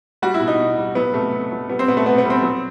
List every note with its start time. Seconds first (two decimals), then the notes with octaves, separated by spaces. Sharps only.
0.22 G3 F#4
0.34 E4
0.41 B2
0.48 D#4
0.59 B2
0.78 G3
0.95 F#3 B3
1.14 C3 A3
1.33 C3
1.51 F#3
1.69 G3 B3
1.79 C4
1.88 B2 B3
1.97 A3
2.06 B2 B3
2.18 B3
2.24 G3
2.30 C4
2.42 F#3